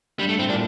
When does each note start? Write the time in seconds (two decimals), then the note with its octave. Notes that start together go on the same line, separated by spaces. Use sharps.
0.19 G2 G3
0.29 A3
0.39 A2 C4
0.49 A#2 D4